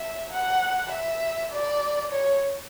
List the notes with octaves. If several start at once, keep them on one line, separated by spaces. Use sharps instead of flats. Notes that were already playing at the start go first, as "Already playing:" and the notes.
Already playing: E5
F#5
E5
D5
C#5